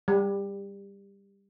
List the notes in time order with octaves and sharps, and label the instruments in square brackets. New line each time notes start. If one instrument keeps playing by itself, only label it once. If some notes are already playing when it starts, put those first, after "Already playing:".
[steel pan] G3